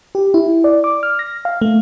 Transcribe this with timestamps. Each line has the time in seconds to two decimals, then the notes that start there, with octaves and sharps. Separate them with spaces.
0.15 G4
0.34 E4
0.64 D5
0.84 D6
1.03 F6
1.19 A#6
1.45 F5
1.62 A3